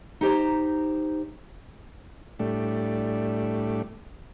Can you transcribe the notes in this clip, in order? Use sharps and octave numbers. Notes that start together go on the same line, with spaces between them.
D#4 G4 C5 A#5
A2 G3 A3 D4